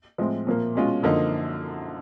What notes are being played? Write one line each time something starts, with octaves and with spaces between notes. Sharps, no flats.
A2 F3 G#3 C4
A#2 F3 A#3
B2 G#3 C#4 F4
F#2 D3 F3 A#3 D#4